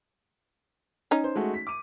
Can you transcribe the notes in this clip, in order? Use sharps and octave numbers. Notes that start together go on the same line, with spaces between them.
C#4 D#4
C5
G#3 A3 F#4
B6
D6 D#7